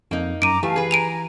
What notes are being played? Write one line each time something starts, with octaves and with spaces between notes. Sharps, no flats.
F2 A#3 D#4
F#2 A#5 D6 D7 D#7
E3 A3 G4 F5 G#5
G#4 B4
G#5 A#5 D7 D#7 F7